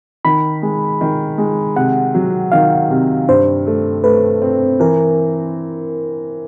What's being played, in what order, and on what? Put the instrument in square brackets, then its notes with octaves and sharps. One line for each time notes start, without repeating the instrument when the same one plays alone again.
[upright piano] D#3 [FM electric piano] B5
[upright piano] G#3
D#3
G#3
[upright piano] C3 [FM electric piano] F#5
[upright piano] F#3
[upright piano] D#3 [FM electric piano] F5
[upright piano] C3
[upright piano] G2 [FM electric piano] C5
[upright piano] A3
[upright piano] A3 [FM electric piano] B4
[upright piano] C4
[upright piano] E3 [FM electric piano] A#4